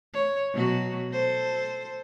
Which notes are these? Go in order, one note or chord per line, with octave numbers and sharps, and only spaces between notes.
C#5
B2 F#3 F#4
A4 C5